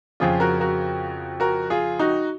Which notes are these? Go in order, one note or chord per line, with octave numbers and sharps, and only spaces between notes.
F2 C#3 F3 F4 G#4
F#4 A#4
F#4 A#4
F#4 A#4
F4 G#4
D#4 F#4